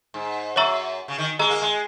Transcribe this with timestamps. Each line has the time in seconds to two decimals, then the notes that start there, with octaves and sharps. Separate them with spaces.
0.14 G#2
0.56 F#2 C#5 E5 A#5 C#6 E6
1.08 C#3
1.18 D#3
1.39 G#3 G#4 D#5 A#5 E6
1.50 A#3
1.62 G#3